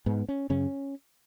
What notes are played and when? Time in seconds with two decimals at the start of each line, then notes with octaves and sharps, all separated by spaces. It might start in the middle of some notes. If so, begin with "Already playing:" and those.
0.06 G#2 B3
0.29 C#4
0.50 F#2 C#3 C#4